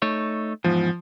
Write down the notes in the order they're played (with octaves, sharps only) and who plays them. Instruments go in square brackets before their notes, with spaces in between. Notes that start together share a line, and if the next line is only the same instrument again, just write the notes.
[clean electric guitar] A3 D#4 C#5
[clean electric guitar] E2 G#2 [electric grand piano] F3